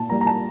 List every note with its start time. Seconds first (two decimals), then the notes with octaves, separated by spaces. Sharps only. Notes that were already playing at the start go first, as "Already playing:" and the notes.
Already playing: A#2 A5
0.09 G3 A#3 A#5
0.21 A#5
0.27 A5